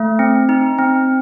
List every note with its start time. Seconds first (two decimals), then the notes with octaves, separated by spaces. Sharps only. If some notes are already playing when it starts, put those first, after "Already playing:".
Already playing: A3
0.19 C4
0.49 D#4
0.78 C4